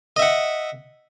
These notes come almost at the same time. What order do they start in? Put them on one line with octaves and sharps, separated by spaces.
D#5 E5 F#5